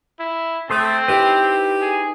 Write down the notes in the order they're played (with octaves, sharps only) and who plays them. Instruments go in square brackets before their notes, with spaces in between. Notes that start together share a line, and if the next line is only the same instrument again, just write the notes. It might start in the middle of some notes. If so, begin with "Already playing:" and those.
[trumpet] E4
[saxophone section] A3 [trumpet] C4 [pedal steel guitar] A4 C5 D#6
[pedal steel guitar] D#4 E4 B4 [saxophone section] G4
[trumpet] G#4